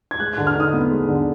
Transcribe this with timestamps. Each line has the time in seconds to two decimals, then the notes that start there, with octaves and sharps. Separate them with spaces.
0.11 G#6
0.20 G#3 F#6
0.33 F#6
0.38 D3
0.47 F6
0.56 D#4 D#6
0.73 B3
0.91 G#3
1.08 D3